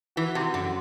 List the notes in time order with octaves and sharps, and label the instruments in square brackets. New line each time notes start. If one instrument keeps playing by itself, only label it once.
[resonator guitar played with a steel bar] E3 [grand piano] F#4
[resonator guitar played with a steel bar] C3
[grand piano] F#2 [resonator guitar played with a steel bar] D3